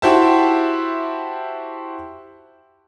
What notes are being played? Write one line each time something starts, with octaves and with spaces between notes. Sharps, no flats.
E4 F#4 G4 C5 E5 A5